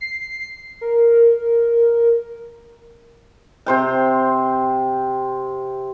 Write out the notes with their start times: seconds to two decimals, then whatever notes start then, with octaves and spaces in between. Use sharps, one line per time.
0.01 C7
0.81 A#4
3.66 C3 C5 G5